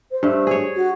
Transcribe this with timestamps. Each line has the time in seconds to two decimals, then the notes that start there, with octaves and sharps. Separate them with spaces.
0.11 C5
0.23 G2 A3
0.47 G#4 C#5
0.75 F#4